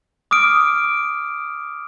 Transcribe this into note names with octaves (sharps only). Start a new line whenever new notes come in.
D6 D#6 F6 D7